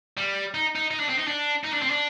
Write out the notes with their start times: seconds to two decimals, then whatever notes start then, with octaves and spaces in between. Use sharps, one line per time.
0.17 G3
0.54 D#4
0.75 D#4
0.91 D#4
1.00 D4
1.09 C4
1.18 D#4
1.27 D4
1.64 D#4
1.73 D4
1.82 C4
1.90 D4